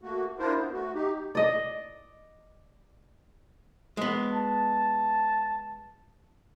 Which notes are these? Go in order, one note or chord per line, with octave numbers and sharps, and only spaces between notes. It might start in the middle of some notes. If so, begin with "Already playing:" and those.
A3 A#3 F#4
D4 E4 F4 A#4 C5
B3
A3 F#4
D#4 G4
D5 D#5
G#3 B3
A5